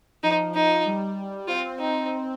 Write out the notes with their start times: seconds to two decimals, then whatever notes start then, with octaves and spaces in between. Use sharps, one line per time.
0.23 F3 D#4
0.54 D#4
0.86 G3
1.48 C4 F4
1.79 D#4